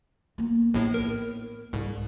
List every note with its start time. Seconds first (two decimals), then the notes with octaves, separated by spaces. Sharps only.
0.38 A#3 B3
0.74 A#1 A2
0.94 A#4
1.73 C2 G#2